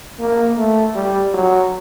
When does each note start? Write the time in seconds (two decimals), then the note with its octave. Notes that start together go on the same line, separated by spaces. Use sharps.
0.19 A#3
0.58 A3
0.95 G3
1.33 F#3